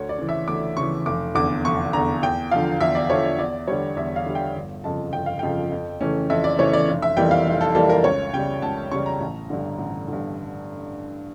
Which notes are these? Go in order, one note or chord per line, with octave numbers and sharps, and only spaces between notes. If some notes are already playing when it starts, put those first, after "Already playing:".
Already playing: D2 C#5
D5
C#3 E3
E5
D2 D6
C#3 E3 C#6
F1 D6
E2 D3 D6
F1 C#6
E2 D3 A#5
E2 G5
D3 F3 F5
E2 E5
D5
D3 F3 C#5
D5
E2 D5
D3 G3 C#5
E2 E5
F5
D3 G3
G5
G1
F2 C#3 F3 A5
G1 G5
F5
F2 C#3 F3 G5
F2
C#3 E3 A3 C#4
F2 E5
D5
C#3 E3 A3 C#4 C#5
D5
F1
E5
F2 E3 G3 A#3 G5
F5
F1
A4
F2 E3 G3 A#3 A4
A#4
C#2 C#5
C#3 G3 G5
C#2 A5
C#3 G3 C#6
A#5
A1
G2 D3
A1
G2 D3